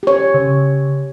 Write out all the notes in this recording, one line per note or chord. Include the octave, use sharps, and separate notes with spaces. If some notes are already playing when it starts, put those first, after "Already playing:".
G4 C#5
C#3